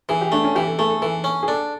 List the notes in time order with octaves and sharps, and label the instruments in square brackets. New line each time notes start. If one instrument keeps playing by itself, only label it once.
[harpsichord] E3 [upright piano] G#4
[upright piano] G4
[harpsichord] A3 [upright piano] D4
[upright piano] C#4
[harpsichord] E3 [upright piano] G4
[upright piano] A4
[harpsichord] A3 [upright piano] G#4
[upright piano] A4
[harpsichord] E3 [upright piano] A4
[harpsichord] C#4
[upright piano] G#4
[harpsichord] D4 [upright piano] A4